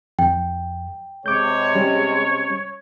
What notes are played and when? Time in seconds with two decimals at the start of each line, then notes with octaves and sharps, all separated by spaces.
0.19 F2 G5
1.26 C3 G#3 C#5 D6 G6
1.75 G3 C#4